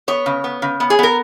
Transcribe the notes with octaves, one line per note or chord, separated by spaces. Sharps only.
B3 C#5
C#3
B3
C#3
B3
G#4
B3 A#4